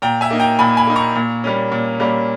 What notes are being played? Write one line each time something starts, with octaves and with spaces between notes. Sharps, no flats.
A#2 G5 A#5
E5 G#5
A#3 D#4
G5 A#5
A#2 G#5 B5
G#5 B5
A#3 D#4
A#5 C#6
A#2
G3 A#3 C#4
A#2
G3 A#3 C#4